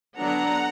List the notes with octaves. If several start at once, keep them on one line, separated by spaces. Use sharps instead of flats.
D3 F#3 B3 D4 F#5 A#5